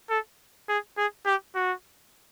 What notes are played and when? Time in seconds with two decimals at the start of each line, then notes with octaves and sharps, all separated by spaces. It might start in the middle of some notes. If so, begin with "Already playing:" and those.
0.10 A4
0.69 G#4
0.97 G#4
1.26 G4
1.55 F#4